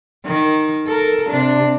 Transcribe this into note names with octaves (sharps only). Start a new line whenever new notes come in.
D#3
A4 A#4
C3 D4